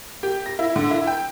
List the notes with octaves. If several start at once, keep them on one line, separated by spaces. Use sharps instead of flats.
G4
A#6
E4
D3
E4
G5